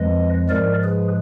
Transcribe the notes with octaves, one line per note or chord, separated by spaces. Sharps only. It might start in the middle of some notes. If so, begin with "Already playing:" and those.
Already playing: F2 F3 G#3 B4 D#5
G#2 F3 G#3 A#4 D5
G#4 B4